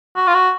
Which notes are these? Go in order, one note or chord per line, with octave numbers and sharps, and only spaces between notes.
F#4
F4
F#4